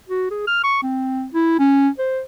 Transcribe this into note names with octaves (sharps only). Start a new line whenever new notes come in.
F#4
G#4
F6
C#6
C4
E4
C#4
C5